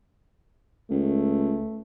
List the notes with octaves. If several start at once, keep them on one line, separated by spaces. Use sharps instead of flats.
C#2 A3